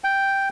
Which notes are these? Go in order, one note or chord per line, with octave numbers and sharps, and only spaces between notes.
G5